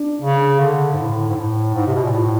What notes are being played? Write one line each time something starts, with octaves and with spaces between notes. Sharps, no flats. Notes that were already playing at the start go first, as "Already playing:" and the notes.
Already playing: D4
C#3
D3
G#2
A2
G#2
A2
G#2
C3
B2
A#2
A2